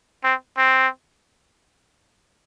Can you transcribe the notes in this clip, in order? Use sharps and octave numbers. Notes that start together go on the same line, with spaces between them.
C4
C4